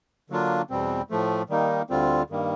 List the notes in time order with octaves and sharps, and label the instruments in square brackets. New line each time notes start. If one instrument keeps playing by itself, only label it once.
[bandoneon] D3 F#3 A#3 D4 F4
E2 B2 G3 C4
A2 F3 A3
D#3 G3 A#3 D#4
D2 D3 G3 C4 F4
G2 D#3 G3 A#3